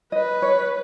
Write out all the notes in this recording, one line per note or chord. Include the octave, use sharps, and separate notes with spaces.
B4 D#5
C#5